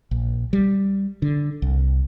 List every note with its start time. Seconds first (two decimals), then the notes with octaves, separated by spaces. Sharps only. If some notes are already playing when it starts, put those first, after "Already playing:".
0.11 A#1
0.53 G3
1.22 D3
1.62 C2